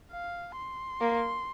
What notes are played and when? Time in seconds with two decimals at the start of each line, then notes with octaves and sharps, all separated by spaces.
0.11 F5
0.57 C6
1.01 A#3